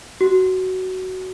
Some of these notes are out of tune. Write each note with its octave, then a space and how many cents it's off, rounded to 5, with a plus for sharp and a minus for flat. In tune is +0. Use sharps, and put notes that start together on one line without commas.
F#4 +15